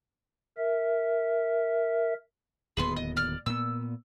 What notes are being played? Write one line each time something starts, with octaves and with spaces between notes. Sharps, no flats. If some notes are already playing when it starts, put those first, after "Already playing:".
A#4 E5
D1 D#2 B3 G#4 B4 C6
D#5
D5 F6
A#2 B3 E6